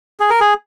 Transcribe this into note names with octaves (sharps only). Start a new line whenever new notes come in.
G#4
A#4
G#4